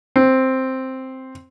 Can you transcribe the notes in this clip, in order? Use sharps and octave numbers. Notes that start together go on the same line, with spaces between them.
C4